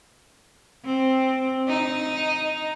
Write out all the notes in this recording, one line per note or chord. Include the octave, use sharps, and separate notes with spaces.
C4
D#4